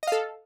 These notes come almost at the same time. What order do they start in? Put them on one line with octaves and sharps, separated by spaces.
D#5 F5 A4